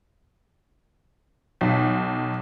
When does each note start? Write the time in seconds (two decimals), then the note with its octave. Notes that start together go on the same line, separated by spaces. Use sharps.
1.61 B1